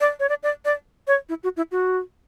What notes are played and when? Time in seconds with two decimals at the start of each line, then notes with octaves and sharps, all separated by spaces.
0.01 D5
0.20 C#5
0.29 D5
0.43 D5
0.65 D5
1.07 C#5
1.29 E4
1.43 F#4
1.57 E4
1.71 F#4